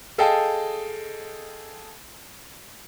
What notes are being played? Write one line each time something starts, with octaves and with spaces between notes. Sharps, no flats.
G#4 A4 D#5 F5 G5 A5